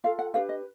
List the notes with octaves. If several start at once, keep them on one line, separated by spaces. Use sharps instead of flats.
F4 A4 F5
F#5
D4 G4 B4 F5
D#5